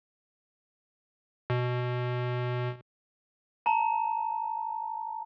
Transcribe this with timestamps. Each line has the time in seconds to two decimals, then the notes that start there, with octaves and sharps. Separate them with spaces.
1.50 B2
3.66 A5 A#5